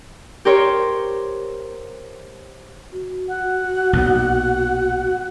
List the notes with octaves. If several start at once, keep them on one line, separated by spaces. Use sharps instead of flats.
G4 A#4 C5 C#5
F#4
F#5
B1 A#2